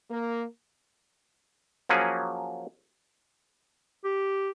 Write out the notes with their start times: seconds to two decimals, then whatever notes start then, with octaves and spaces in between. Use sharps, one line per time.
0.10 A#3
1.89 F3 F#3 A#3 C#4 G#4
4.04 G4